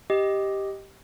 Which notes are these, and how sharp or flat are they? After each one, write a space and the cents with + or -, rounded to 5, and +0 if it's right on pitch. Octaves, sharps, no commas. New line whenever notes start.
G4 +0 D#5 +5